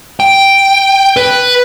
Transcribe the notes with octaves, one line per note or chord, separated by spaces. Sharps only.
G5
B4